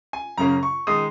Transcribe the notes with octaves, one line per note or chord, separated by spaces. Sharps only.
G#5
F#2 C#3 A#3 C#4 A#5
C#6
D#3 G#3 D#6